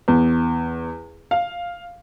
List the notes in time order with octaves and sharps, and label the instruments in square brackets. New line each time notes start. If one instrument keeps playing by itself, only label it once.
[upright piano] E2
F5